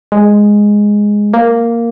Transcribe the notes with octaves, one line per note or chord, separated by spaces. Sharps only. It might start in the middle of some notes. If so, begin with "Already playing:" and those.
G#3
A#3